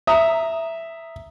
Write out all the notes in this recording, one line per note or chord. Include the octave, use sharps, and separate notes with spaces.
E5 A#5 D#6